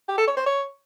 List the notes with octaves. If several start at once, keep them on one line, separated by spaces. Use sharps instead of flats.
G4
A4
C#5
C5
C#5